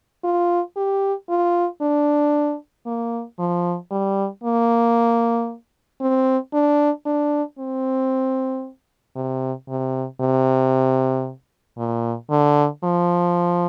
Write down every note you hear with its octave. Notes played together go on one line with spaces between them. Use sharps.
F4
G4
F4
D4
A#3
F3
G3
A#3
C4
D4
D4
C4
C3
C3
C3
A#2
D3
F3